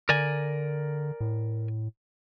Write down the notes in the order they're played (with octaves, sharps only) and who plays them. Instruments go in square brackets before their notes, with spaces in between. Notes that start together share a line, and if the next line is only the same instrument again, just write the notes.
[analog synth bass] D3 [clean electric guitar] A#4 D5 G#5
[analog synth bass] A2